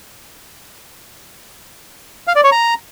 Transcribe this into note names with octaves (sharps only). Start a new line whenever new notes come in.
F5
D5
C#5
A#5